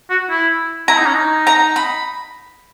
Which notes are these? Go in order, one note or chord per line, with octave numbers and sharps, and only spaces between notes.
F#4
E4
E4 A#5
D#4
C#4
D#4
A#5
B5